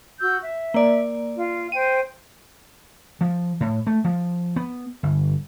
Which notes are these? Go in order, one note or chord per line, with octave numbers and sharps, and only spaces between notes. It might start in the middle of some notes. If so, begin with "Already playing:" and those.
F#4 E6 G6
E5
A#3 D5
F4
C5 G5 D#7
F3
A2
A3
F3
B3
G1